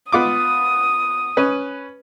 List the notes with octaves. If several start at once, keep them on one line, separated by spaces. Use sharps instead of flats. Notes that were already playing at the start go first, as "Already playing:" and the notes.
B3 F4 D6 D#6
C#4 B4